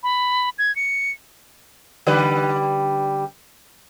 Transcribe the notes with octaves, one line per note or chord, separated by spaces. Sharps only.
B5
G#6
C#7
D3 G3 B4